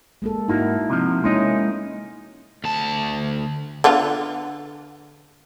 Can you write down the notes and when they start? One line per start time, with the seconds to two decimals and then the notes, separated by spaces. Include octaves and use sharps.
0.22 G#3 A#3 A4
0.48 G#2 A#3 D#4 E4 F#4
0.90 C3 F3
1.24 G#3 A#3 C#4 D#4 E4 D#5
2.64 D2 A5
3.84 D3 B3 F4